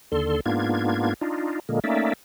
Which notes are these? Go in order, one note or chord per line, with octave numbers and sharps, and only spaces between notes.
D#2 D3 A4 C6
G#2 A#3 B3 D4 F4 G#6
D4 D#4 F4
A#2 D3 G#3 A#3
A3 A#3 C#4 D#4 D5 E5